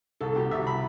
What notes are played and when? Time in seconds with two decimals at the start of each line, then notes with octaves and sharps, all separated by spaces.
0.21 C2 A4
0.36 B2 G4
0.51 C2 E5
0.67 B5